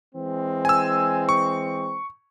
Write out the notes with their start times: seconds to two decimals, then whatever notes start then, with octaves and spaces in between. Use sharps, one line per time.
0.15 E3 G#3 C4
0.65 G#5 E6
1.29 C#6